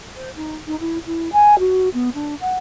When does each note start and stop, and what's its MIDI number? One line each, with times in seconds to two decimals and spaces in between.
0.15 0.29 72
0.36 0.55 63
0.66 0.78 63
0.80 0.98 64
1.06 1.29 64
1.32 1.58 80
1.59 1.89 66
1.93 2.09 59
2.14 2.34 62
2.40 2.57 78